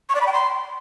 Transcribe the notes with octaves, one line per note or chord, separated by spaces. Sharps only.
C#6
D5
B5
G5
C6